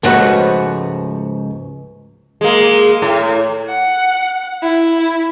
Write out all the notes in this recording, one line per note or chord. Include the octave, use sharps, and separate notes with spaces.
C#2 G#2 F3 A3 F#4 B4
G#3 A#3
A2
F#5
E4